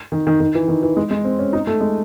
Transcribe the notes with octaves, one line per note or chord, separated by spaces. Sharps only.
D#3
D#3
D#3
E3
D#3
E3
G#3
G#3
C4
C#4
D#4
A3
G#3